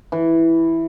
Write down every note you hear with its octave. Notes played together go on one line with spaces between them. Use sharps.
E3